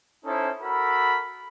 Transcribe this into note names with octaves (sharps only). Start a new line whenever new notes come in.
C#4 D#4 E4 A4 C5
F#4 A4 A#4 B5